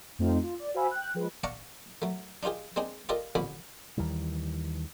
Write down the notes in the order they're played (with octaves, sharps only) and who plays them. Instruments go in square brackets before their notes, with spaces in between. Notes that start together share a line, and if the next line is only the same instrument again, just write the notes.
[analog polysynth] F2 A3 C4 D#4 F4
F4
D5
F#4 C5 F5 G#5 B5 E6
G5 F#6
F3 G#3 B4
[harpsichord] D5 F5 F#5 A5 A#5 C#6
F#3 A3
D4 D#4 F4 G4 G#4
G#3 C4 D4 D#4 G#4
F4 G4 A4 A#4 D5 D#5
A1 F2 D3 C#4 B5 D6
[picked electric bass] D#2 D#3 E3 G3